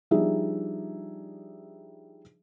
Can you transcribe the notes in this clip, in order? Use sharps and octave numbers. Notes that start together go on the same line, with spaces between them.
F3 G3 D4 D#4 G#4 E5